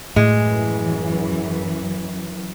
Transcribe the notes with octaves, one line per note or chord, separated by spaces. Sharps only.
F#2 A2 E3 G#3